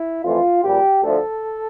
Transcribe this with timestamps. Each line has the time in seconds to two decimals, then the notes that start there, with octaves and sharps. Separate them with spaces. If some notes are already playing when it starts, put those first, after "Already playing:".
Already playing: E4
0.24 F2 E3 A3 F4
0.63 A#1 A#2 G3 G4
1.03 D2 D3 F3 A3 A4